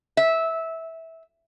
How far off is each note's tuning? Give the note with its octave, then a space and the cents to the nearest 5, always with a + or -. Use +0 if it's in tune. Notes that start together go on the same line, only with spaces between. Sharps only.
E5 -15